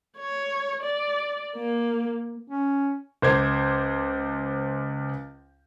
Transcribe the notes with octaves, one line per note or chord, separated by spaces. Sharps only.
C#5
D5
A#3
C#4
C#2 C5 D6 G#6